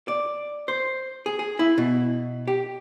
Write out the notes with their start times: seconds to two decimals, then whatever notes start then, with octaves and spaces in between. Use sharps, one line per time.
0.08 D5
0.68 C5
1.26 G#4
1.39 G#4
1.59 E4
1.78 B2
2.47 G4